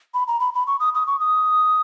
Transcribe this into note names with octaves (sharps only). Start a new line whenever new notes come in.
B5
A#5
B5
B5
C#6
D#6
D#6
C#6
D#6